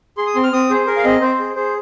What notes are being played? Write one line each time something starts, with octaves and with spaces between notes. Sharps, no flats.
G#4 C6
D#6
C4 C6
F6
C4 D#6
G#4 C5
G#4 A#4
F5
C4 D#5
C4 C5
G#4
G#4 C5